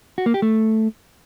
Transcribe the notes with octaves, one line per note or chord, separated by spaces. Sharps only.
F#4
A#3
G4
A3